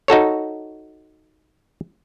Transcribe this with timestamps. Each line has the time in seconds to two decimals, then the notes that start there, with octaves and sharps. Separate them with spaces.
0.08 D#4 F#4 A4 C#5